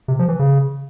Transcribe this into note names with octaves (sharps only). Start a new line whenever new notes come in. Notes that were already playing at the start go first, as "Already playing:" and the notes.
C3
F3
E3
C#3